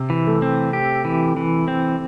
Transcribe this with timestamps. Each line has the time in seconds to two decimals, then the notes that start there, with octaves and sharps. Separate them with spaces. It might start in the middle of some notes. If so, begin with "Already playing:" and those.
Already playing: C3
0.10 E3
0.27 A3
0.42 C4
0.73 G4
1.05 E3
1.37 E3
1.68 C4